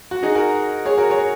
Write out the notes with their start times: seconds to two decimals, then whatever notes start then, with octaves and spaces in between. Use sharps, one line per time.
0.11 F#4
0.23 D#4 G#4
0.35 F#4 A#4
0.85 G#4 C#5
0.98 F#4 A#4
1.10 G#4 C#5